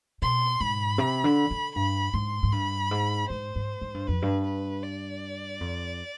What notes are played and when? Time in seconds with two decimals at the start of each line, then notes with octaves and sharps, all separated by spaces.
0.22 B2 C6
0.60 G#2 B5
0.98 C3
1.24 D3
1.51 D3
1.76 G2 B5
2.14 G#2 C6
2.43 G#2
2.52 G2 B5
2.91 G#2
3.30 G#2 C5
3.56 G#2
3.81 G#2
3.94 G2
4.07 F2 B4
4.22 G2
4.45 B4
4.83 D5
5.61 F2